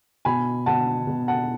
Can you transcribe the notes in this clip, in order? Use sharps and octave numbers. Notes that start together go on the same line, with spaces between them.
B2 G#5 B5
B2 F#5 A5
B2
F#5 A5